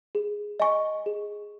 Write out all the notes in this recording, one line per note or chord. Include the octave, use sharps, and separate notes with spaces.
G#4
D#5 G#5 C#6
G#4